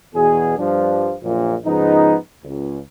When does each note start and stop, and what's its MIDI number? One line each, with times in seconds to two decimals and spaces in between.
0.14 0.57 40
0.14 0.57 47
0.14 0.57 68
0.57 1.14 43
0.57 1.14 53
0.57 1.14 62
1.22 1.55 34
1.22 1.55 42
1.22 1.55 46
1.65 2.15 44
1.65 2.15 49
1.65 2.15 53
1.65 2.15 56
1.65 2.15 59
1.65 2.15 63
2.44 2.77 37